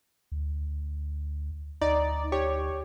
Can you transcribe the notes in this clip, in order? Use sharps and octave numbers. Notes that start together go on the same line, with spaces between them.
D2
D2 D#4 D5
G4 C#5